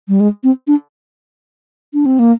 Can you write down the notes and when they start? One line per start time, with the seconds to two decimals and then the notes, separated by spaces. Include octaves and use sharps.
0.09 G3
0.20 G#3
0.44 C4
0.67 D4
1.94 D4
2.06 C4
2.19 A#3